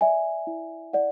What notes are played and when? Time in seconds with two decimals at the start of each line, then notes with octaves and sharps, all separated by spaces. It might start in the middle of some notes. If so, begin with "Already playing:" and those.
0.01 D5 E5 G#5
0.47 E4
0.93 E4 D5 F#5